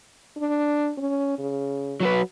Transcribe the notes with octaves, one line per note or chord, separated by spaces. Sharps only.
D4
C#4
C#3
F#3 F#4 B4